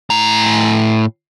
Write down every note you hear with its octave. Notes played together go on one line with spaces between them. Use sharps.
A2 A#5